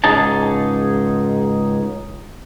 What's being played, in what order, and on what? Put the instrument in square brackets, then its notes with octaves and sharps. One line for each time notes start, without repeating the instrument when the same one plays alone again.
[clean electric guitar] C#2 G#2 D#4 G#4 A5